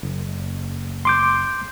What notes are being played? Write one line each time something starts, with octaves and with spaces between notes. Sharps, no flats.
F#1
C6 D6 G6